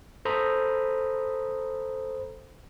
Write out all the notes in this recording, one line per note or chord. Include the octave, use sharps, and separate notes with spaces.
A4 C5 A#5 B5 D#6